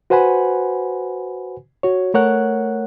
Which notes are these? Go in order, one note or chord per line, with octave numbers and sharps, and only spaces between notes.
F#4 B4 C5 F#5 G#5 B5
F#4 C#5
A3 A#4 C#5 F#5 F#6